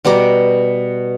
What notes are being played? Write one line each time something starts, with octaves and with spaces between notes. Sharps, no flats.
B2 G3 A#5 D6